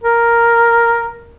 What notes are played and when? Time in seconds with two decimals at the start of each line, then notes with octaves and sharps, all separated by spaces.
0.04 A#4